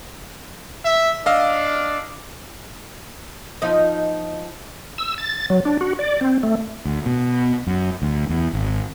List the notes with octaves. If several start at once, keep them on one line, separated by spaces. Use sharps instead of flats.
E5
D4 D#5 F5 E6
F3 D#4 D#5
E6
A6
F#3
D4
F#4
D5
C4
A3
D2
B2
F#2
D2
E2
G#1